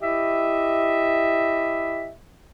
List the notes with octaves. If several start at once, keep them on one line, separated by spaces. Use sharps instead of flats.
E4 G4 D#5 E5